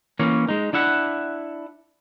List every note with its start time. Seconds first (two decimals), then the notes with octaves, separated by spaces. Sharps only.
0.19 E3 A#3 C#4 C#5
0.48 G#3 D#4
0.73 D4 E4 E5 F#5